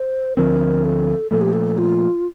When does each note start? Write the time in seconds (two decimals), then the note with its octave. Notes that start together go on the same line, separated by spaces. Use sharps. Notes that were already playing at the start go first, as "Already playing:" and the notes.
Already playing: C5
0.36 D2 D3 F3 C4 A#4
0.84 A4
1.31 A#2 F3 A3 A4
1.41 G4
1.53 A4
1.78 F4